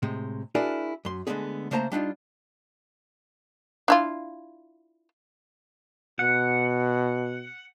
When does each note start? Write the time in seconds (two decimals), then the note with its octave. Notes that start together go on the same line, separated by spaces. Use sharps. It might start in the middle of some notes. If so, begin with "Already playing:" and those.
0.03 A2 C3 G#3
0.55 D4 E4 F#4 G#4 A#4 D5
1.05 F#2 C6
1.27 D3 G#3 A3 B3 C#4 G#4
1.71 C#3 A3 A#3 C5 A5 A#5
1.92 G3 D4 D#4 F4
3.88 D4 E4 F4
6.19 B2 F#5